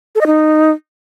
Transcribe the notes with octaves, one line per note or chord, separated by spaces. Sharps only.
A4
D#5
D#4